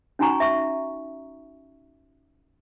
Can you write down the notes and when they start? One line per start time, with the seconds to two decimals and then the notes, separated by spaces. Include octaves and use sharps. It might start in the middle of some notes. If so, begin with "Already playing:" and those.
0.19 C#4 D#4 F#4 G#5 A#5 C#6
0.40 E5 C#6